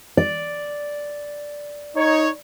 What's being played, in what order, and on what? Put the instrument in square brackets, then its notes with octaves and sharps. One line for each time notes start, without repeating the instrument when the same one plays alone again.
[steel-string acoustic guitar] D5
[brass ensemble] D#4 C#5